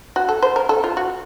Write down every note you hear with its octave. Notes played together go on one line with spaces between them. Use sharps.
F#4
A4
C5
A#4
A4
F4
F#4